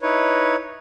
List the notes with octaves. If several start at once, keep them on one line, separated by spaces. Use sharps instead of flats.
D#4 E4 B4 C#5